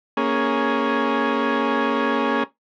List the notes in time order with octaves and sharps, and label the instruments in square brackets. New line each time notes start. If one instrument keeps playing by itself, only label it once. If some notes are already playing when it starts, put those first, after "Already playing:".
[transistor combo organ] A#3 C#4 G#4